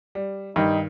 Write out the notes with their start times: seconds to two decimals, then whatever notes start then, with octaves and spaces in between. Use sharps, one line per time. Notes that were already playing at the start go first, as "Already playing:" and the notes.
0.15 G3
0.56 G2 D#3 D#4